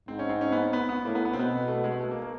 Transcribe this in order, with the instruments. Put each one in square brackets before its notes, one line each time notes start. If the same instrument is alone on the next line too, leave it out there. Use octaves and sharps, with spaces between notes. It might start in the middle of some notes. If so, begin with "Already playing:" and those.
[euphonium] G#2 [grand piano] C4
[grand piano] C#4
C4
C#4
B3
C4
B3
B3
[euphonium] A2 [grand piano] A#3
[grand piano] B3
B3
C4
[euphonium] B2 [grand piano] B3
[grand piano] A3
G#3
A3
A#3
A#3